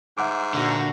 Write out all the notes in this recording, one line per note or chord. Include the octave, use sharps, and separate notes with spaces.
G#2 E5 F#5 D6
A#2 D3 F#4